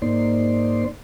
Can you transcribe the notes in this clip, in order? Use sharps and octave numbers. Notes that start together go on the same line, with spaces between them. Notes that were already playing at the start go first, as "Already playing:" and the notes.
G#2 A#3 D#4 C5 D5 C6